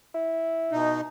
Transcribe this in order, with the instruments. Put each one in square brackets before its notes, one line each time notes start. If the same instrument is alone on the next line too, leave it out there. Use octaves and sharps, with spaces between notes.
[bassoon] E4
[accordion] B2 D#4